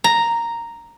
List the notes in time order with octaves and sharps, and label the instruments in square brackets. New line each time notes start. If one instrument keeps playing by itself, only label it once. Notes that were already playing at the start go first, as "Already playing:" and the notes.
[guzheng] A#5